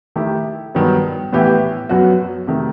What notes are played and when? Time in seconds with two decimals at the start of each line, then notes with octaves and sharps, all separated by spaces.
0.16 D#3 A3 E4 G4
0.75 G2 D#3 F#3 B3
1.33 A2 E3 B3 E4 G4
1.89 F#2 F#3 B3 F#4
2.47 C3 D#3 A3